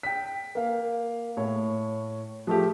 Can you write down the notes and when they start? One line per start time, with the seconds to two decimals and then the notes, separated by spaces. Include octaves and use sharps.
0.03 G5 B6
0.55 A#3 F5
1.37 A2 C#5
2.47 F3 A3 G4